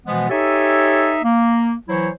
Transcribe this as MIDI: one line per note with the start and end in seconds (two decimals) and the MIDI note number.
0.06 0.26 47
0.06 0.26 52
0.06 0.26 53
0.06 0.26 56
0.06 0.26 59
0.30 1.17 63
0.30 1.17 67
0.30 1.17 69
0.30 1.17 73
0.30 1.17 76
0.30 1.17 80
1.23 1.73 58
1.89 2.09 52
1.89 2.09 54
1.89 2.09 64
1.89 2.09 72
1.89 2.09 73